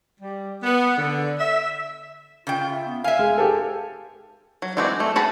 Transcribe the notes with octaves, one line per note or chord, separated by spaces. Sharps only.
G3
B3
D3
E5
C#3 F4 G5
E5
B3
E5 F5 G#5
G#3
G4 A4
F#3
E3 G#3 C4 F#4 G4
A3
F#4 G#4 A5 B5